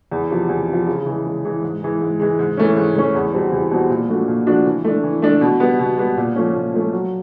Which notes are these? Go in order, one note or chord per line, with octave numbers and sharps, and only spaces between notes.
E2
C3 F3
E2
C3 F3
C#3
E3 G#3
C#3
E3 G#3
G#2
E3 G#3
G#2
E3 G#3
G#2
E3 A3 C#4
G#2
E3 A3 C#4
E2
B2 G3 C4
E2
B2 G3 C4
A#2
F3 A3 D4 F#4
A#2
F3 A3 D4 F#4
E3
A3 D4
E3
A3 D4
B2
G3 B3
B2
G3 B3
A#2
F3 A3 C#4
A#2
F3 A3 C#4
F#3